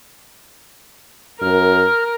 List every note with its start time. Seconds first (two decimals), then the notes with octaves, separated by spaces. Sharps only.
1.42 F#2 A#4 F6